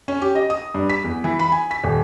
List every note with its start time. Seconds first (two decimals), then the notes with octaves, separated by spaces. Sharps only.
0.08 C#4
0.22 G4
0.35 D#5
0.50 D#6
0.74 G2
0.89 B6
1.04 E2
1.24 E3
1.39 B5
1.52 G#5
1.71 B6
1.84 D#1